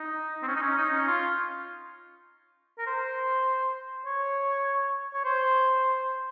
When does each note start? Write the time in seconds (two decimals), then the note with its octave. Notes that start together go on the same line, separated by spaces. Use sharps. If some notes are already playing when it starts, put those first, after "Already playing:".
Already playing: D#4
0.43 C4
0.48 C#4
0.56 D#4
0.63 C#4
0.77 D#4
0.93 C#4
1.07 F4
2.78 A#4
2.87 C5
4.06 C#5
5.14 C#5
5.25 C5